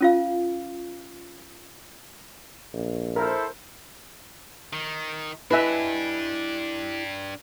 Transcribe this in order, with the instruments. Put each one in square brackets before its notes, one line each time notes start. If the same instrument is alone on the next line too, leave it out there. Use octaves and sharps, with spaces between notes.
[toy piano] C#4 F4 F5
[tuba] A#1
[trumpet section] E4 A4 C5 [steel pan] A#4
[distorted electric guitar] D#3
[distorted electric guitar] D4 G4 [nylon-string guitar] E4 D#5 G#5 [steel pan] B4 E5